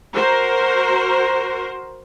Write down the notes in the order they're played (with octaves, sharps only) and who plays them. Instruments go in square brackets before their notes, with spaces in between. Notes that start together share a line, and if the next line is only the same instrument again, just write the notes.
[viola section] F#4 A#4 C5